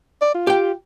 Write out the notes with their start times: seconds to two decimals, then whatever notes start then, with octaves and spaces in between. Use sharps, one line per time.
0.21 D5
0.35 F4
0.47 G4 G5